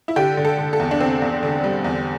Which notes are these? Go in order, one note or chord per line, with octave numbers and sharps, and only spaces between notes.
E4
D3 G4
D3
A4
D3
A4
E2
D4
D3 C4
E2
D3
G3
E2